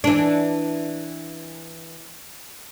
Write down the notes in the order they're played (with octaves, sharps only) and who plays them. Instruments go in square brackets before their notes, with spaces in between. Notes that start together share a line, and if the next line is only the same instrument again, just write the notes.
[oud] E3 D4